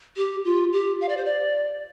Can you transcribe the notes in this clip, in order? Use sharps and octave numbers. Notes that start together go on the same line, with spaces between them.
G4
F4
G4
F5
D5
C5
D5